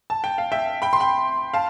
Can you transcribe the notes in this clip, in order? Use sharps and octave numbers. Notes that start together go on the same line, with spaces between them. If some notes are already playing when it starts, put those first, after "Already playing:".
A5
G5
F5
E5 G5
G5 B5
C6
G5 B5
F5 A5